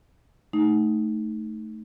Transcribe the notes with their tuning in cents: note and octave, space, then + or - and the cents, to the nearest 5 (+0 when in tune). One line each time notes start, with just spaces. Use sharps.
A3 +0 D#4 +0